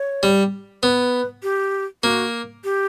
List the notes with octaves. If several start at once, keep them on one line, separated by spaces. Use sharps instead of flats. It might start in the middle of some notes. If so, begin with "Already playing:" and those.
Already playing: C#5
G3
B3 B4
G4
A#3 F#4
G4